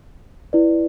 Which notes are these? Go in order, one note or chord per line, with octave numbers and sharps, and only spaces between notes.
E4 B4 D5